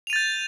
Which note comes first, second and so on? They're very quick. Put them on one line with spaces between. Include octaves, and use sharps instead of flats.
F7 D#7 A6 G6